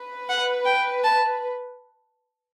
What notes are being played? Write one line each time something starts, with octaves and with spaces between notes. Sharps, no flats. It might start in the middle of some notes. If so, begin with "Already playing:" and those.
Already playing: B4
F#5
G5
A5